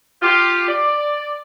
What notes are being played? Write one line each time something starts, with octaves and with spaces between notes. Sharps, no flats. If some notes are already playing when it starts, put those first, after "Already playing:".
F4 G4
D5